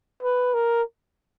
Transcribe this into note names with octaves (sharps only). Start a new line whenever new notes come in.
B4
A#4